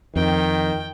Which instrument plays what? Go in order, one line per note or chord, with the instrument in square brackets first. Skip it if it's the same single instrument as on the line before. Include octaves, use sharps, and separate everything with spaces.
[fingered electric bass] F2 [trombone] D#3 [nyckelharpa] G5